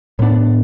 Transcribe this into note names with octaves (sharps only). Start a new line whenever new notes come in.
A2 G3 B3 D4